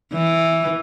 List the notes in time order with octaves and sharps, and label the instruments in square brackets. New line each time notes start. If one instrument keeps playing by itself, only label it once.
[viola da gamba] E3